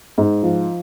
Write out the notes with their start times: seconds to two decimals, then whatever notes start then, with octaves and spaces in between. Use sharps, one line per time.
0.18 G#2
0.43 F3